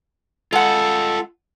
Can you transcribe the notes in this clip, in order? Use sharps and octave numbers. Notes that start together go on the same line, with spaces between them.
G#3 F4 A4 D#5 F#5